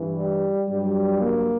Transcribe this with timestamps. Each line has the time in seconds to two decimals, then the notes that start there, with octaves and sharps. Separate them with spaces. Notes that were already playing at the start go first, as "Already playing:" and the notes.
Already playing: G2 E3
0.15 G3
0.68 G2 F#3 G3
1.21 A#3